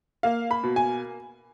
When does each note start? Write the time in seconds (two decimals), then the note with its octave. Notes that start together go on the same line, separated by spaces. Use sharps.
0.23 A#3 F5
0.51 B5
0.63 B2
0.76 G#5